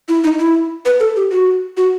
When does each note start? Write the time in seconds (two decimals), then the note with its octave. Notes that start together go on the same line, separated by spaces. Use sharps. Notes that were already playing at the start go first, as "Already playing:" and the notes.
0.09 E4
0.24 D#4
0.39 E4
0.86 B4
1.00 A4
1.16 G4
1.31 F#4
1.77 F#4